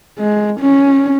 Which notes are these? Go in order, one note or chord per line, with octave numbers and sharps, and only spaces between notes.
G#3
C#4